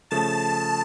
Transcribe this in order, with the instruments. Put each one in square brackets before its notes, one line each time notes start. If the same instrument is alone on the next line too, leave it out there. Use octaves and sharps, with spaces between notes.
[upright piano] C#3 F3 A3 [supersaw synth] A5